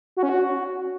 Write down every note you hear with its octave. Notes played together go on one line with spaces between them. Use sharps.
F#4
C#4
F#4